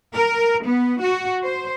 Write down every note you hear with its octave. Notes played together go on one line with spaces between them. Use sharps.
A#4
B3
F#4
C5